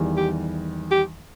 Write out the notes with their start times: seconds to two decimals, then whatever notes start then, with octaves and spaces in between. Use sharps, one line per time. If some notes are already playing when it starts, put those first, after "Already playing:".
Already playing: E2 D#3 G3
0.17 G4
0.91 G4